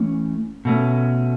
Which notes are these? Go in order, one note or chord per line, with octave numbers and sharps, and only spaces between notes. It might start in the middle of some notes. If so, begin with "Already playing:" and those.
Already playing: E3 A3 C#4
B2 A3 C#4